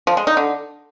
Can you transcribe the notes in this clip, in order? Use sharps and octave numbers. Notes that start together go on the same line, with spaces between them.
F3
G#3
D#4
D3